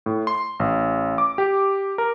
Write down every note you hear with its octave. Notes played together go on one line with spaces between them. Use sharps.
A2
C6
A1
D6
G4
A#4